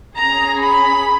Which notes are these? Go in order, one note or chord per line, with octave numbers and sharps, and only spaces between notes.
C#4 G#4 A#5
B5